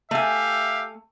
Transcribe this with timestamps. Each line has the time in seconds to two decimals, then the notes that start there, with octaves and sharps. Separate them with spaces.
0.11 A3 G4 E5 F5 G#5